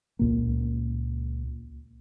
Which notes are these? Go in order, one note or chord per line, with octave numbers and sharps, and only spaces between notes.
C#2 A#2 A#3